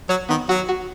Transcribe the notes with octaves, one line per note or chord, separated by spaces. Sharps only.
F#3 C#5
D#3 B3
F#3 F#4
F#4